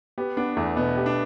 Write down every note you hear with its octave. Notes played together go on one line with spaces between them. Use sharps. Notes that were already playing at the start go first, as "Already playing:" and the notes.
B3 G4
B3 D4
E2 A3
B2 B3
G4
D4